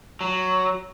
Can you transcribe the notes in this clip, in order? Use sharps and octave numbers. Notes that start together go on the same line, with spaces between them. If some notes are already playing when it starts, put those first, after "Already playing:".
F#3